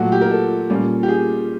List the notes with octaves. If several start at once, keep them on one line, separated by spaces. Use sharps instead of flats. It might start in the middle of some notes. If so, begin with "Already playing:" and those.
Already playing: A#2 F#3 A3 F#4
G4
A#4
A4
A#2 G3 A#3 C#4
G4
G#4